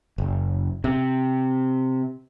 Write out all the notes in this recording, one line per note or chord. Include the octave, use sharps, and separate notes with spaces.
F#1
C3